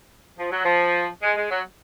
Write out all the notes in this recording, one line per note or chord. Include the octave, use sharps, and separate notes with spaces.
F3
F#3
F3
G#3
G#3
F#3